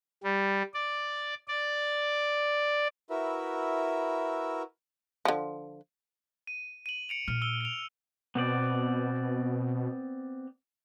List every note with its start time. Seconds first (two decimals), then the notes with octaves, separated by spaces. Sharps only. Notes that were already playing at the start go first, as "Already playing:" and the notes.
0.23 G3
0.74 D5
1.48 D5
3.10 E4 F#4 A#4 B4 E5
5.25 D3 F3
6.47 D#7
6.86 D#7 F#7
7.09 C#7 D7 F7
7.28 A#2 F6
7.42 E6 G7
7.61 D7 F7
8.35 B2 B3 C4 D5